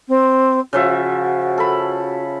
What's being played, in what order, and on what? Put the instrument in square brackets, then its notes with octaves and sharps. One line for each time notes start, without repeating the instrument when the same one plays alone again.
[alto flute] C4
[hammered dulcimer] C#3 F3 E5 [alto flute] F#4
[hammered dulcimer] A4 B5